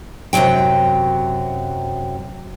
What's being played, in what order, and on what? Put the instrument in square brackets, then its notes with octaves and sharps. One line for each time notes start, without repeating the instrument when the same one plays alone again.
[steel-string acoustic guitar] F#2 C3 E3 F#3 G5